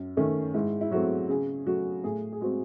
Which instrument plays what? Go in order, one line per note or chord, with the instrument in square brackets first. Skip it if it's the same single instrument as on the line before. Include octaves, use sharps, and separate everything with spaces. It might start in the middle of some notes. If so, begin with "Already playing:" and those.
Already playing: [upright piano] F#2
D#3 A3 C#4
G#2 E4
E4
F#3 A3 C4 F#4
C#3 G#4
F#3 A3 F#4
A2 G#4
G#4
G#3 C4 F#4